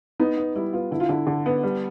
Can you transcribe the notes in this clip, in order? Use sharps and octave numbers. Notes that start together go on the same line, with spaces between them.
B3 D#4
B3
G3 E4
B3 F4
D3 E4
F4
D3 E4
D3
B3
G3